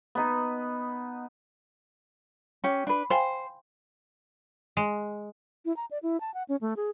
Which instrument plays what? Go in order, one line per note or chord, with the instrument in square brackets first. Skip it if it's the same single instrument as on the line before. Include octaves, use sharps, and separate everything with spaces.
[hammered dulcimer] B3 D#4
[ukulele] C#4 G4
D4 B4
[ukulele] C5 [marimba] F5 G5 G#5
[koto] G#3
[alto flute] E4
A#5
D5
E4
A5
F#5
C#4
A3
G#4